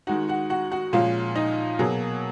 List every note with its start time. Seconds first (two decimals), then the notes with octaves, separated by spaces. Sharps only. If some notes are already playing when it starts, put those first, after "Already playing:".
0.07 D#3 G#3 D#4 F#4 F#5
0.28 F#4 F#5
0.50 F#4 F#5
0.72 F#4 F#5
0.93 A#2 F3 G#3 C#4 F4 F5
1.36 D#4 D#5
1.79 B2 F#3 A#3 G#4